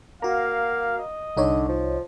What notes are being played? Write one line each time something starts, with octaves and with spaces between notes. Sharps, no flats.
A#3 F#4 F5 A#5
D#5
C2 D3 D#4 C#5
F3